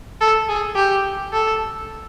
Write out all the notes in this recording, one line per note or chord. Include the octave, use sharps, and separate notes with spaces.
A4
G#4
G4
A4